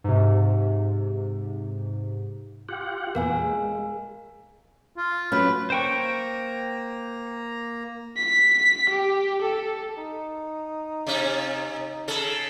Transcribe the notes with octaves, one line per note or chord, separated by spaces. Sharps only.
G#2 C3
F4 G4 F#5
E2 A#2 B3 A#4 F5 G#5
G#3
F4
F#3 A3 C#4 B4
A#3 C5 G5 A#5 C#6
B6
G4
A4
D#4
C3 C#4
C#3 A4